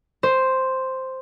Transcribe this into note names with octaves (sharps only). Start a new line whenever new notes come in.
C5